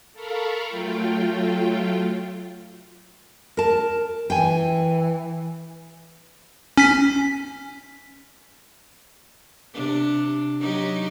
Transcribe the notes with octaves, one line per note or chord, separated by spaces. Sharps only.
A4 A#4 F5 A#5 B5 C#6
F#3 A3 F4 G5
A#4 A5
E3 G5 G#5
C#4 B6
C3 D4
F#3 D#4 G4